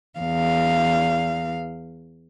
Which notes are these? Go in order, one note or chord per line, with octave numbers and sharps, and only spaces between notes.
E2 F5